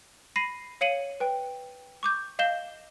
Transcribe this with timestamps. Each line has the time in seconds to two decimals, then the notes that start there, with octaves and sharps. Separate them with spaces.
0.36 B5 A#6 C7 D#7
0.81 C#5 F5 C#7 D#7 F#7
1.20 B4 G5
2.03 C#6 D6 G6
2.39 D#5 F5 G6 E7 G7